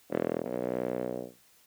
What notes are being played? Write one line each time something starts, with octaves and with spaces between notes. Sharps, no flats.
E1
B1